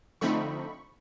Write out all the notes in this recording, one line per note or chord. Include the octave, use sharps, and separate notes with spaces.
D3 F3 A3 C4 D#4 B5 C#6